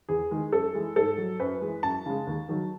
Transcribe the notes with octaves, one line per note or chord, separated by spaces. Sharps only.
E2 G#4
D#3 G#3
F#2 A4
E3 G#3
G#2 A4
F#3
F#2 B4
E3 G#3
F#2 A5
C#3 G#3
D#2
D#3 F#3